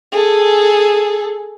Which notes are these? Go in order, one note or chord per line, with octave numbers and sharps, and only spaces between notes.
G#4 A4